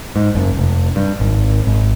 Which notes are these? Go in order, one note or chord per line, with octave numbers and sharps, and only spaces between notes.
G#2
F#1
F1
G2
G#1
G#1